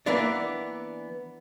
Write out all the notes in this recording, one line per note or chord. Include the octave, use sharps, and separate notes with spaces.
E3 A#3 B3 D4 D5